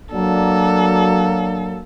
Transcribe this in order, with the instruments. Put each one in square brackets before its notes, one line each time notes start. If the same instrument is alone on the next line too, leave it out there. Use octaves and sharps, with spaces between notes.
[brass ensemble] F#3 A#3 D4 [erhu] A4